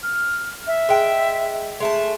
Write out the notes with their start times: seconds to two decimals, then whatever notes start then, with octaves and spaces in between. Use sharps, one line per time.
0.03 F6
0.67 E5
0.89 G#3 G5
1.80 G#3 A3 A5